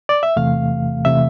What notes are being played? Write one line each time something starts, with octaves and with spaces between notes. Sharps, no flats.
D5
E5
E2 C3 E3 A3 F5
C3 E3 A3 E5